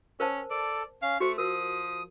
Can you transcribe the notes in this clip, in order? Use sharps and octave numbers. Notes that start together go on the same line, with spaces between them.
C#4 A#4 C5 A5
A4 D5
C#4 F5
A3 F#4 C5 C#6
F3 A#4 D#6